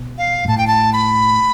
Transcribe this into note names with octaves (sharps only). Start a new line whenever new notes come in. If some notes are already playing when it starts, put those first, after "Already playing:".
Already playing: B2
F5
G2
A2 A5
G5
A5
B5